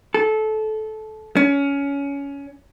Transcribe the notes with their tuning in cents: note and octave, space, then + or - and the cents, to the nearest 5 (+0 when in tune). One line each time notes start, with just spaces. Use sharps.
A4 -20
C#4 +20